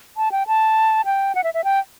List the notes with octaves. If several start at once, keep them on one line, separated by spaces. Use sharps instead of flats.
A5
G5
A5
G5
F#5
E5
E5
G5